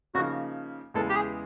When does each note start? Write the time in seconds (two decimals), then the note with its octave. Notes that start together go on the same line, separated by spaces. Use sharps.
0.15 C#3 F3 A#3 D#4 F#4
0.94 E2 C#3 E3 G#3 B3 A4
1.09 G4
1.15 G#4